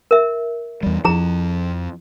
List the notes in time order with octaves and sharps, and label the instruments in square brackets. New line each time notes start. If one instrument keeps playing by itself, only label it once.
[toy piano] A#4 E5
[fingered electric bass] E2 G3
[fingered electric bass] F2 F3 [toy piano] E4 G#4 A#5